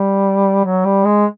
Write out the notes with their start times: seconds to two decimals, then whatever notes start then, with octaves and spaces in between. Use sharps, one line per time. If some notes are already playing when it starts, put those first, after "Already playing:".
Already playing: G3
0.65 F#3
0.85 G3
1.04 G#3